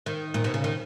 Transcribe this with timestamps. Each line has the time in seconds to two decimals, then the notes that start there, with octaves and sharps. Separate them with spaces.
0.06 D#3
0.34 A#2
0.44 B2
0.54 C#3
0.64 D#3